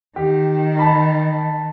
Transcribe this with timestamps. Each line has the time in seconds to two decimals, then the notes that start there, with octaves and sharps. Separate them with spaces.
0.16 D#3 G4
0.79 A5 B5